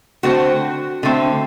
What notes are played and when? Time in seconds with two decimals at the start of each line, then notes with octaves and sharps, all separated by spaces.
0.23 D3 A3 C4 F#4
1.03 D3 A3 C4